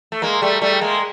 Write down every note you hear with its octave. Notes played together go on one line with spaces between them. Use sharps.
A3
G#3 A#3
G3 A3
G3 A3
G#3 A#3